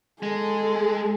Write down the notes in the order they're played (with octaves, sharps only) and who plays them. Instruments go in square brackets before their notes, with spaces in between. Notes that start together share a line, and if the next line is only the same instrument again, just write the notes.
[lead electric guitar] G#3 [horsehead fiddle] G#4 A4